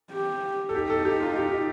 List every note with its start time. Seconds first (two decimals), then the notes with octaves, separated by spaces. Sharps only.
0.12 G4
0.69 A4
0.74 D#4 G4
0.90 A4
1.05 G4
1.20 F4
1.36 G4
1.52 G4